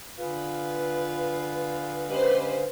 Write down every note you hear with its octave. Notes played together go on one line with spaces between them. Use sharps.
D3 F4 G#4 B4 F5
G#3 C#4 G4 B4 C5